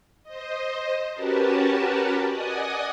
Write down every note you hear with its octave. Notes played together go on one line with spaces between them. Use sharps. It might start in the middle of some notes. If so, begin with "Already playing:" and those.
C5 D#5
C#4 F#4 G4 A#4 B4 A5
D5 D#5 F#5 G#5 D#6